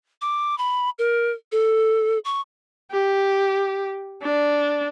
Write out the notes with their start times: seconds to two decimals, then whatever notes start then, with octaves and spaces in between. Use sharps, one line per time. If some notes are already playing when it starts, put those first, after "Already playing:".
0.21 D6
0.58 B5
0.99 A#4
1.52 A4
2.25 C#6
2.91 G4
4.22 D4